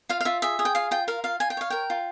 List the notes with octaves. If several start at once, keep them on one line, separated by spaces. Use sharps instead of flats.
F4 F5
F5
F4 E5
G#4 E5
G#4
G5
F4 F5
F4 G5
A#4 F5
F4 F5
F4 G#5
G5
C#5 F5
A#4 G5
F4